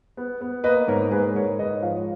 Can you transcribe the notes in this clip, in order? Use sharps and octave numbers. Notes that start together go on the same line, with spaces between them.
B3
B3
A#3 B4 D#5
G#2 A#4 C#5
G#2 G#4 B4
G#2 A#4 C#5
G#2 B4 D#5
F3 C#5 F5
C#5